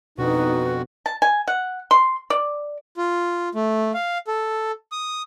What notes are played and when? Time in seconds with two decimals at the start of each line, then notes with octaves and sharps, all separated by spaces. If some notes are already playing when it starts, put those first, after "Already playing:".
0.18 F2 B2 D4 D#4 F#4 B4
1.06 A5
1.22 G#5
1.48 F#5
1.91 C6
2.30 D5
2.97 F4
3.55 A3
3.94 F5
4.28 A4
4.92 D#6